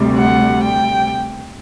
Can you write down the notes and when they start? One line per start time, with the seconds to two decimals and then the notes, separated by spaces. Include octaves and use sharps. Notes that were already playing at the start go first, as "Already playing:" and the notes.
Already playing: D2 C3 G3
0.16 F#5
0.62 G5